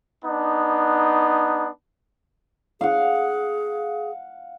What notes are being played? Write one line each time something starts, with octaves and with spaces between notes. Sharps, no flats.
B3 D4 D#4
G#4 F5 F#5